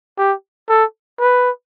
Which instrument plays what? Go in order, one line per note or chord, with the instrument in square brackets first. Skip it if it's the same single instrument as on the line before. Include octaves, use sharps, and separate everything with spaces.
[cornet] G4
A4
B4